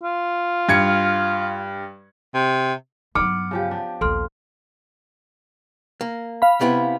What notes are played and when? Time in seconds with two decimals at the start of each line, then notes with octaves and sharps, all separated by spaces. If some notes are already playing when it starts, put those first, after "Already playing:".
0.03 F4
0.69 G2 G#6 C#7
2.34 C3
3.15 G2 F#3 B3 D6 F6 C#7
3.51 C#3 F3 G4
3.71 D4
4.01 A#1 D#2 A4 C6 F6
6.01 A#3
6.42 F5 B5
6.61 C3 B3 E4